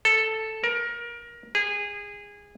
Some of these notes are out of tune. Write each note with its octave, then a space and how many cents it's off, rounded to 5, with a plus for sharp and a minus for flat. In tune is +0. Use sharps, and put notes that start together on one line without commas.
A4 +0
A#4 +25
G#4 -20